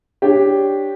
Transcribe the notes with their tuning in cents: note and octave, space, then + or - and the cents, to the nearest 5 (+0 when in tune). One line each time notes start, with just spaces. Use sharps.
D4 +0 G4 +0 C#5 -5